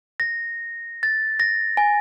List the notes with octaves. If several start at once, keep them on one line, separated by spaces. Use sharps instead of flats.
A#6
A6
A#6
G#5